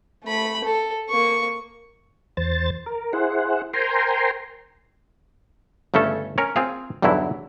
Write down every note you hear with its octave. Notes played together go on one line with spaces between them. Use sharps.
A3 B5
A4
A#3 C#6
E2 C5 A6
A#4
E4 G#4 C5 F#5
A#4 C5 G5 G#5 A#5 C6
G1 C#3 A3 C#4 A4
C#4 A#4 C#5
C4 F4 G#4 F5
B1 E2 G2 D3 F#3 E4